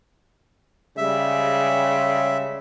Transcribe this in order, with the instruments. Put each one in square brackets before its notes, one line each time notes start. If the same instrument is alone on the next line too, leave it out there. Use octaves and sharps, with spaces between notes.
[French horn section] C#3 G3 G#3 [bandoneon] E5